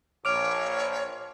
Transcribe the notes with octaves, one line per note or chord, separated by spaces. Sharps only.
A#1 C#5 D6 F6 D7